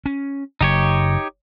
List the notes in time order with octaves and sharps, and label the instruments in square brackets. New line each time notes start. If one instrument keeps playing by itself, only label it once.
[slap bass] C#4
[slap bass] F#1 [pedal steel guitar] D#4 G4 C#5